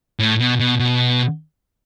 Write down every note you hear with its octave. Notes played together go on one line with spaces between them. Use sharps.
A2
B2
B2
B2